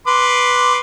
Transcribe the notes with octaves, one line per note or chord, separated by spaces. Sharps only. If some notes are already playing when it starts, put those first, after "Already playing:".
B4 C6 D6